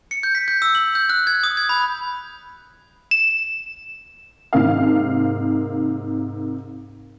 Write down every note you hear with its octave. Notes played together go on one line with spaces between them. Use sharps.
C#7
G6
B6
G6
E6
F#7
G6
F#6
G#6
D#6
G#6
B5
E7
G#2 C3 D#3 A#3 F5